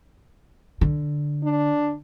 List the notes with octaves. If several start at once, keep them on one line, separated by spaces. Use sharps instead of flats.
D3
D4